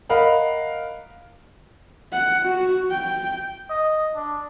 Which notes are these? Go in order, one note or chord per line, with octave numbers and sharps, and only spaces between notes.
A#4 D#5 F5 F#5 B5
F#5
F#4
G5
D#5
D4